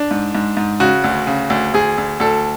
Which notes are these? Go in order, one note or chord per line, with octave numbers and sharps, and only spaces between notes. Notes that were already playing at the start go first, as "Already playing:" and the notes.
Already playing: D4
G#2
G#2
G#2
C#3 F#4
D2
C#3
D2
D2 G#4
D2
D2 A4